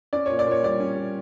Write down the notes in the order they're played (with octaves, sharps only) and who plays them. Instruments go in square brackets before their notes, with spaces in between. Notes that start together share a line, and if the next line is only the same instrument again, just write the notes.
[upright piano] C#4 D5
A#2 C#5
D5
A#2 C#5
G3 D5
C#4
G3